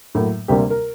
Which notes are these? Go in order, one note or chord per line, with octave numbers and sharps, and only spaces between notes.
A2 F#3 A#3
D2 C3 G3 A#3 G4
A#4